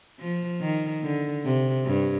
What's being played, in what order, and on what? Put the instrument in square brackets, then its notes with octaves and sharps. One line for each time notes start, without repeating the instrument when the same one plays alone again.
[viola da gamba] F3
D#3
D3
C3
G2